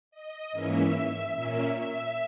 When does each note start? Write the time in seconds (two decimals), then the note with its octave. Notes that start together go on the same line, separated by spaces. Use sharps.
0.11 D#5
0.52 G#2 E3 A#3 C#4 E5
1.34 A#2 A#3 C#4
1.76 E5